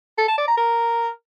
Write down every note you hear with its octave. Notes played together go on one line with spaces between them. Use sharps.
A4
A5
D5
A#5
A#4